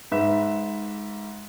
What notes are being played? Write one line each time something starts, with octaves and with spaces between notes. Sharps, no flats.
G#2 B4 E5